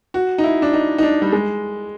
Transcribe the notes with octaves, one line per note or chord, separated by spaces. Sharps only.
F#4
D#4
E4
D4
D#4
D#4
D4
G3
G#3